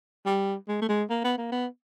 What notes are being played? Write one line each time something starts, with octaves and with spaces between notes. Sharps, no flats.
G3
G#3
A3
G#3
A#3
B3
A#3
B3